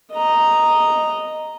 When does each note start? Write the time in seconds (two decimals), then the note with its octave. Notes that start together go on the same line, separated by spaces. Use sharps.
0.13 D#5 A#5